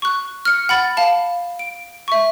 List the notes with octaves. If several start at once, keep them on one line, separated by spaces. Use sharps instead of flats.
C#6 F#6
F6 C#7
F#5 B5 A6
F5 A5
D7
E5 C#6